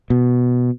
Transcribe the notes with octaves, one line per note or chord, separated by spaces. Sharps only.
B2